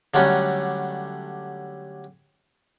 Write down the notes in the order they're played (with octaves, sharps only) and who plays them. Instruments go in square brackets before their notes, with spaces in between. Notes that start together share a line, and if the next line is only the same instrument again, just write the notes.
[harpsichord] D3 F#3 G3 A3 C#4